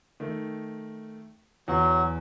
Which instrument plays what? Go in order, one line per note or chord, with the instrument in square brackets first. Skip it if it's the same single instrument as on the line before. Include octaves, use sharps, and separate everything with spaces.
[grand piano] D#3 A3
[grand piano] E2 [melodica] F#3